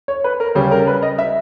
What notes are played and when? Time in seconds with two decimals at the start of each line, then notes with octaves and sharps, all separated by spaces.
0.08 C#5
0.24 B4
0.40 A#4
0.55 C#3 G3 C#4 G#4
0.71 A#4
0.87 B4
1.03 D#5
1.18 E5